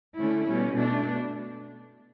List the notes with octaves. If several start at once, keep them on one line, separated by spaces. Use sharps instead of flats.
D3 A3 C#4 E4
B2 G3 C#4
B2 A3 D4